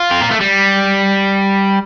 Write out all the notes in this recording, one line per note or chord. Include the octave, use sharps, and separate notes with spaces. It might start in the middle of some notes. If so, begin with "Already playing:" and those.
Already playing: F4
C4
A#3
A3
G3